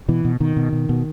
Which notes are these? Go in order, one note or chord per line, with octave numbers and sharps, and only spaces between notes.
B2 E3
B2
B2 D#3
B2
B2
B2